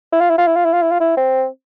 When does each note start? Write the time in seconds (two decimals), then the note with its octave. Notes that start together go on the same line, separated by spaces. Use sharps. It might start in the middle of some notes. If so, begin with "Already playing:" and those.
0.13 E4
0.21 F4
0.30 E4
0.38 F4
0.47 E4
0.56 F4
0.65 E4
0.73 F4
0.82 E4
0.91 F4
1.00 E4
1.17 C4